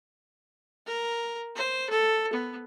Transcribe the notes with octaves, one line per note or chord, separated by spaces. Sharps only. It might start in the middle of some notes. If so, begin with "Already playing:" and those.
A#4
C5
A4
B3